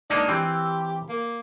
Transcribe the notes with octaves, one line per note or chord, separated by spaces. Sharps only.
G#3 A#3 D4 D#4
E3 C4 G4
A#3